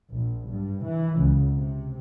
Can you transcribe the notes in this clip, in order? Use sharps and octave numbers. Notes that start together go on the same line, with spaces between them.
A#1
G2
E3
C#2
C3